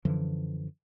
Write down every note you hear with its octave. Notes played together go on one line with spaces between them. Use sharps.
F#2 D3 E3 F3